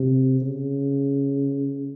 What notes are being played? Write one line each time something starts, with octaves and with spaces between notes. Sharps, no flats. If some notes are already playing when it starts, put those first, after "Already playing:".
Already playing: C3
C#3